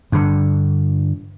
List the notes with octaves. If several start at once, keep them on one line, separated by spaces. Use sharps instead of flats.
G2 D3